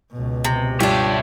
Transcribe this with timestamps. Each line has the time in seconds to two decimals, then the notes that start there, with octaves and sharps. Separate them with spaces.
0.13 C#2 B2
0.44 C3
0.80 G2 G3 D4 F4 G4 C#5 E5